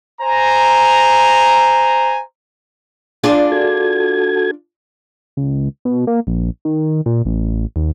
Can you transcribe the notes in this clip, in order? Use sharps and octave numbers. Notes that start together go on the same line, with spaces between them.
C5 G#5 A#5
D4 F4 G#4
F#4 A4 G#6
C#2
B2
A#3
A#1
D#3
A#2
A1
D#2